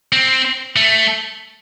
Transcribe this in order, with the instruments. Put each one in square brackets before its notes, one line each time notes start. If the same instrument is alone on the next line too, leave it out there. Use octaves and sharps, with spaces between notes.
[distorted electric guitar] C4
A3